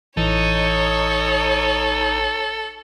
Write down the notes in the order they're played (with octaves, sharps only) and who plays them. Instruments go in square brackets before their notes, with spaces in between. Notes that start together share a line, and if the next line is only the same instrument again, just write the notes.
[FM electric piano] A1 E3 [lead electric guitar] D#4 [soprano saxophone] A4 [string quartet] C#5